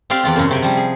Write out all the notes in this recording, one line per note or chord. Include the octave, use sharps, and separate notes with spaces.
C4 G4 D5 F5 C6
E2 F4 D5
F#2 C#3
C3 G5 G#5
F3 G3
G#4